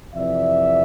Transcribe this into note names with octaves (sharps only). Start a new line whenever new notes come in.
F2 C3 E3 D5 E5